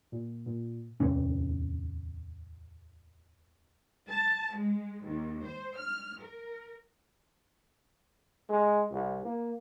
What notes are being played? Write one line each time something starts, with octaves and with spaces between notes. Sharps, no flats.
A#2
A#2
D1 E2 C3 C#4
A5
G#3
D#2
C5
F6
A#4
G#3
C2
A#3